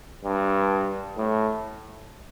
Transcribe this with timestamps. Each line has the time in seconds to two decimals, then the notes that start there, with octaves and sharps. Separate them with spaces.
0.25 G2
1.17 A2